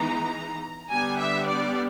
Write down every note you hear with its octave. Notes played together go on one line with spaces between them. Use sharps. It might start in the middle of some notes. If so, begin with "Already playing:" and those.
Already playing: E3 G#3 B3 D#4 A#5
D3 G3 B3 D4 G#5
E5
D5